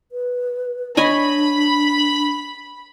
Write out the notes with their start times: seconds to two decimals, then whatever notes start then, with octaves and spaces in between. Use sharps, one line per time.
0.12 B4
0.97 D4 C#5 D#5 G#5 B5